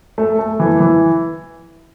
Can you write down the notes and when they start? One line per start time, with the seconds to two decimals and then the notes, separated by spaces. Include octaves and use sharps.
0.18 A3
0.39 A3
0.60 E3
0.81 E3